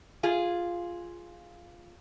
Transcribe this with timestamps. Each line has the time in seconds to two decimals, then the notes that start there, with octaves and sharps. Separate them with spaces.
0.23 F4 G#4